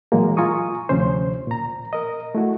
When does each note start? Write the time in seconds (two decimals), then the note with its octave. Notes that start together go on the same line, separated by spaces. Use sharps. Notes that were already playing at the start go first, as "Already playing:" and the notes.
0.12 A#2 E3 F#3 G#3 A#3
0.37 F4 G#5 A#5 C#6 D#6
0.89 D2 C3 F3 C#4 C5
1.47 A#2 A#5
1.93 A#4 D#5
2.35 A3 E4 F#4